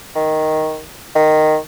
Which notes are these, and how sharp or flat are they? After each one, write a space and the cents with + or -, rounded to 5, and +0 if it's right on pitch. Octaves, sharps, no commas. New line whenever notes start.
D#3 +5
D#3 -10